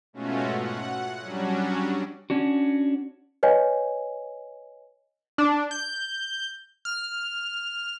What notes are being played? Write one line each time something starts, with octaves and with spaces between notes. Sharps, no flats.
G#2 B2 A3 C#4 F4 F#4
F#5
F#3 G3 C#4 D4 F#4
C#4 D4 F#4
B4 C#5 D#5 G#5
D4
G6
F6